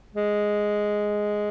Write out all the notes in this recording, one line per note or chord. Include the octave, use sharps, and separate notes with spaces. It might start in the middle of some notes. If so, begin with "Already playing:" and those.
G#3